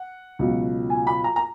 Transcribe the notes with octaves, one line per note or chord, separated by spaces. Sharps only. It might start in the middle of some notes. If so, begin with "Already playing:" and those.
Already playing: F#5
C#2 B2 F#3
G#5
B5
A#5
A#5